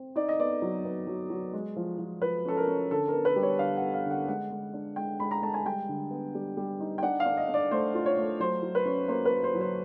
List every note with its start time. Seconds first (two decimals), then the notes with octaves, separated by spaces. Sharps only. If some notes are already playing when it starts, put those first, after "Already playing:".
Already playing: C4
0.16 D#4 D5
0.29 D#5
0.39 B3 D5
0.62 F#3
0.85 B3
1.07 F#3
1.30 F#3
1.53 G#3
1.76 F3
1.99 F3
2.21 F3 B4
2.46 C#4 A4
2.57 A#4
2.67 C#4
2.91 D3 A4
3.08 B3 A#4
3.25 B4
3.36 G3
3.43 C#5
3.59 D3 F5
3.77 F#5
3.82 B3
3.94 F5
4.05 D3
4.11 F#5
4.28 G#3 F#5
4.52 G#3
4.74 D4
4.96 G#3 G5
5.20 G#3 B5
5.31 A#5
5.43 G#3 A5
5.54 G#5
5.65 G3 G5
5.89 D3
6.11 B3
6.35 G3
6.57 G3
6.80 D#4
6.98 G5
7.02 D4 F#5
7.20 F5
7.26 D4
7.37 D#5
7.49 D4
7.54 D5
7.71 A3 C5
7.95 F4
8.06 C#5
8.18 A3
8.40 F#3 C5
8.63 F#3
8.75 B4
8.85 C#4
9.08 A#3 C5
9.25 B4
9.32 A#3
9.44 C5
9.55 F#3
9.61 C5